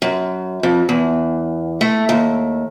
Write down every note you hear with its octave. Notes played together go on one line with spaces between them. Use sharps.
F#2
F2
E2
A3
D#2